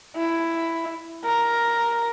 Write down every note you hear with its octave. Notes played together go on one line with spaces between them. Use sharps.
E4
A#4